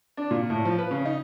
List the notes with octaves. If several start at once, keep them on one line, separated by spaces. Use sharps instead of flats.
D4
A#2
A2
F3
B4
C#3
D#4